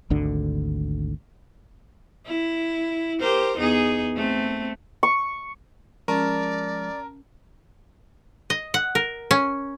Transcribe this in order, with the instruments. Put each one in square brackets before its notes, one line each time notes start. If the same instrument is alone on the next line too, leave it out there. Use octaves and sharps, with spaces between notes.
[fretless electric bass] G#1 D2 D3
[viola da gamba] E4
G4 A#4 C5
E2 D#4 G#4
A3 C4
[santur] C#6
[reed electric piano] F3 G#3 [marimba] C#4 [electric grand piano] A#4 A5 [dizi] D5
[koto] D#5
F#5
A#4
C#4